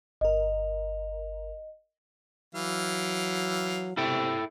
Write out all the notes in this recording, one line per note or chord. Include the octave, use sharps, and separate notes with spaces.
G1 A#4 D#5
E3 F#3 F5
C3 E4 A4 G5